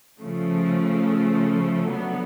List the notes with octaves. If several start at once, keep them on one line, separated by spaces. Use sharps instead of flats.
C#3 F3 A3
D3 F#3 B3